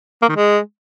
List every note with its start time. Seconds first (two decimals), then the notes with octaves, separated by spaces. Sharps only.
0.22 A#3
0.29 D#3
0.36 G#3